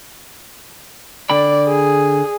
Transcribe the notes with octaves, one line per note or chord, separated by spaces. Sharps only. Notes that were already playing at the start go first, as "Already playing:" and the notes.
D3 D5 G5 B5
G#4